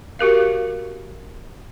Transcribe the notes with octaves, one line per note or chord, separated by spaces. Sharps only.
F#4 G4 A#4 F5